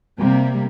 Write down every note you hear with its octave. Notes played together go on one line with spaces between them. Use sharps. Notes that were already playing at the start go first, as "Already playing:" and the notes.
C3 G3 A#3